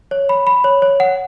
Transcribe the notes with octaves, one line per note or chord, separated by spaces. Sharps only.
C#5
B5
B5
C#5
C#5
F#5